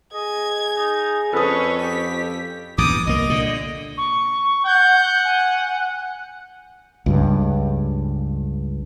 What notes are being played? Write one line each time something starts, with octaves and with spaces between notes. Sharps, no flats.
G#4 D#5 G#6
D#4
F2 C#4 A4 B4 C#5 D#6
G4 B6
A#1 E2 G2 D6 D#6
C2 A#3 D#5
A#2 D3
C#6
F#5 G6
G#5
C#2 G2